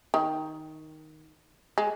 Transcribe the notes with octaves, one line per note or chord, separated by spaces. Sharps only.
D#3
G#3